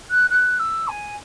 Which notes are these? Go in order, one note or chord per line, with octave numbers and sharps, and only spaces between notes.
F#6
F#6
E6
G#5